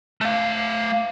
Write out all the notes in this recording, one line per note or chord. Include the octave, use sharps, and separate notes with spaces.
A3 F5